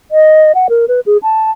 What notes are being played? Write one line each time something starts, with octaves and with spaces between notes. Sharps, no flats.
D#5
F#5
A#4
B4
G#4
A5